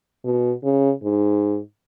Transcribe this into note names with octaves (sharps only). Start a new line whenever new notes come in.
B2
C#3
G#2